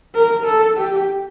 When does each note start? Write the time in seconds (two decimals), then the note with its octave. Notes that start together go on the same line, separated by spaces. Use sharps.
0.15 A#4
0.45 A4
0.77 G4